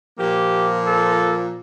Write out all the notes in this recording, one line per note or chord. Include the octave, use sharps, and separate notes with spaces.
A#2 F3 A#3 G4
A4